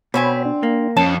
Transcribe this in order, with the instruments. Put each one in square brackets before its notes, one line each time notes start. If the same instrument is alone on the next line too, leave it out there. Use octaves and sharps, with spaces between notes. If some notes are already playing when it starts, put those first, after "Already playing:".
[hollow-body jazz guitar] B2 [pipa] D3 C4 G#5 [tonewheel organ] C#5 B5
[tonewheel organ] D4
[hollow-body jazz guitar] A#3
[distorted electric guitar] F2 [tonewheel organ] C#4 [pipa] A5